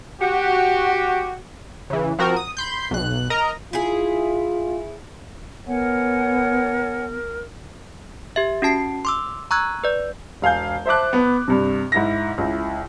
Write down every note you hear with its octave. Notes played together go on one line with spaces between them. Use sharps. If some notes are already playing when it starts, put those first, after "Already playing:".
F#4 G4
C#3 E3
F3 C4 F#4 A#4
D#6
B5 C6 G6
B1 F#6
A#4 D#5 A#5
E4 F4 G#4
B3 A#4 C#5 F#5 G#5
G4 E5
C#4 F#4 A5 C7
C6 D6 E6
A#5 C#6 E6 F#6 G#6
B4 D5
E1 F5 G#5 G6
C5 E5 A5 D6 F#6
B3
G2 C3
G#2 E4 A#6
C#2 E4